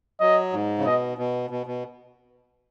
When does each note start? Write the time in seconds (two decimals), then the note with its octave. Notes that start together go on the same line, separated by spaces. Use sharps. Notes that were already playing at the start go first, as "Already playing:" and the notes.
0.20 F#3 D#5
0.53 G#2
0.79 C#3
0.85 B2 D#5
1.18 B2
1.50 B2
1.66 B2